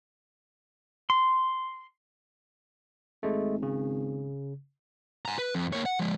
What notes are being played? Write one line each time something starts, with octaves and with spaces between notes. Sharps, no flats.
C6
G#1 G#3 A3
C#3
G#5 A#5
B4
F2
A#3 C#5
F#5
F3 G#3